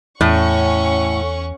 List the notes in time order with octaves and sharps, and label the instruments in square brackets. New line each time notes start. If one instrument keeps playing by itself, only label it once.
[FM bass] E2 [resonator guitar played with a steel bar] A2 [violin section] C#4 F#5 C#6